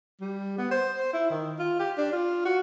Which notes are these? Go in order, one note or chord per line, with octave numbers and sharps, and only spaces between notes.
G3
B3
C5
C5
E4
D#3
F4
G4
D4
F4
F#4